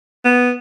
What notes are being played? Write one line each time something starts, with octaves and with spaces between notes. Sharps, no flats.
B3